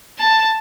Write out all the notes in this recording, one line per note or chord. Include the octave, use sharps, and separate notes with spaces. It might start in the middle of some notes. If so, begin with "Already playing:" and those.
A5